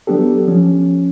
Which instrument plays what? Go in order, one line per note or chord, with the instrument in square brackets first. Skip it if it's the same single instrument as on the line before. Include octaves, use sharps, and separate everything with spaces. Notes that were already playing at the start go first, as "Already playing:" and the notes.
[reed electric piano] F#3 B3 D4 G4 A4
F3 C#4